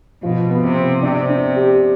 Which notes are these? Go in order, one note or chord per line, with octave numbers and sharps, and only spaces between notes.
B2 F3
B3
C3
B3
C3 D4
D4
G4